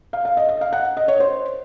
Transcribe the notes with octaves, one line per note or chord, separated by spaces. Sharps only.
F5
F5
D#5
D#5
F5
F#5
D#5
C#5
C5